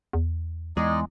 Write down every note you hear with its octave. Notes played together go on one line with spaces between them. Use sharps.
E2
E2 G#3 D#4 D5 D#5